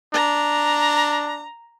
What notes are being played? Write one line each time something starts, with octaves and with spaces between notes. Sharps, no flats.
D4 A#5